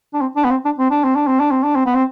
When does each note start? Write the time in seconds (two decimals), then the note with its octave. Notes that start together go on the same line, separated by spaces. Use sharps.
0.14 D4
0.21 C4
0.36 D4
0.45 B3
0.51 C4
0.65 D4
0.79 C4
0.91 D4
1.04 C4
1.16 D4
1.27 C4
1.40 D4
1.51 C4
1.63 D4
1.75 C4
1.86 B3
1.95 C4